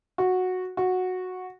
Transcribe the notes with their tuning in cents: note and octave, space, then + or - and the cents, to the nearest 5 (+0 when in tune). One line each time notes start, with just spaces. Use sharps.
F#4 -10
F#4 -10